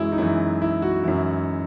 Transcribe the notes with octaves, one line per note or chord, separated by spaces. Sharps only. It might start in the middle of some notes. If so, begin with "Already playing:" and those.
Already playing: F#2 E3 F#3 G#3 E4
D#4
F#2 E3 E4
E4
F#4
F#2 E3 E4